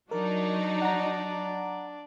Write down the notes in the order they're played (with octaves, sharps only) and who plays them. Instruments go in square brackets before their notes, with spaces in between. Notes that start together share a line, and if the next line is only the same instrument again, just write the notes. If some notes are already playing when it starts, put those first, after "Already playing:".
[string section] F#3 D#4 [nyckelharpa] D4 D5 [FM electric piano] A#4
[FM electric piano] F#5 A#5